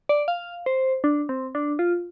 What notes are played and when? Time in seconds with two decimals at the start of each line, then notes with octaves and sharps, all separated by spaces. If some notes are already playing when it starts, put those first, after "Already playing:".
0.09 D5
0.28 F5
0.66 C5
1.04 D4
1.29 C4
1.55 D4
1.79 F4